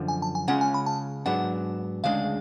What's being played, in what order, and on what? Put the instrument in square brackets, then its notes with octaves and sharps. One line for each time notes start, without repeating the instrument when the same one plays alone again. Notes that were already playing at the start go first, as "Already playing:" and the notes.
Already playing: [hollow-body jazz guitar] F#2 D3 F3
[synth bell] G#5
A5
G#5
[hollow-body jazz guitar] C#3 G#3 C#4 F4 [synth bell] F#5
[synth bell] G#5
B5
A5
[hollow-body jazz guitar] G#2 F#3 B3 D4 [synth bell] F#5
[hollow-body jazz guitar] D2 C#3 G#3 D4 [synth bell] F5